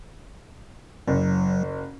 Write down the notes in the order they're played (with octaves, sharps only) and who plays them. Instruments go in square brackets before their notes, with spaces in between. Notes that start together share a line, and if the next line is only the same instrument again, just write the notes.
[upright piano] F#1 [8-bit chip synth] F#3